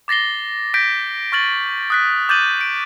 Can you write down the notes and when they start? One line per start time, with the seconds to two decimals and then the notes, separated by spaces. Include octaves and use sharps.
0.08 D6 A6 A#6 C7 G7
0.74 G6 A#6 B6 D7
1.32 C#6 F6 A6 F#7
1.90 D#6 F#6 B6
2.29 D6 G6 A6 D#7 F#7
2.61 D7